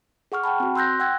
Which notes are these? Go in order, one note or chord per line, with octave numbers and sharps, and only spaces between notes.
G#4 F#5 C#6 F6
F#5 G5 A5 B5
C4 F#4
C6 E6 F#6 G6 A#6
F#5 G5 E6 F#6 G#6